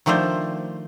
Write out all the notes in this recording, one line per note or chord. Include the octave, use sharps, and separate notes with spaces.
D#3 F3 A3 D4 C5